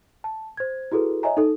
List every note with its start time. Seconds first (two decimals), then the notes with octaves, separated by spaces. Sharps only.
0.24 A5
0.57 C5 G#6
0.92 E4 F#4 G#4 A4 B4
1.23 C#5 D#5 E5 G#5 A#5
1.37 D#4 A4